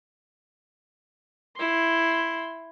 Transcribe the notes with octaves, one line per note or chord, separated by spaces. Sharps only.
E4 C6